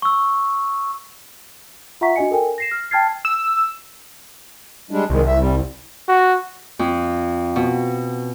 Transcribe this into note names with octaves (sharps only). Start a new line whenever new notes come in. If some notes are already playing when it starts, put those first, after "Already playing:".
C#6 E6
F4 E5 F#5 A#5 C#6 B6
D4 F#4 D#5 G#5 C#7
A4 A#4 G5 G#5
A#6 C7 E7
F6
G5 A5 F6 G#6 A6 C7
E6
G3 G#3 D4
C2 D#3 G#3
E5
G3
F#4
F2
B2